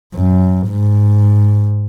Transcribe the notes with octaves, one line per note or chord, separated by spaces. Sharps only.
F#2
G#2